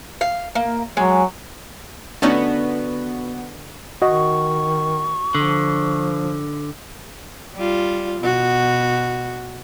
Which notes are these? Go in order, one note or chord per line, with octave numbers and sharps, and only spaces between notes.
F5
A#3
F#3 G#3
D3 A3 B3 C#4 D#4 F#4
D#3 F#4 D#5 C#6
D3 F3
G3 F4
B2 F#4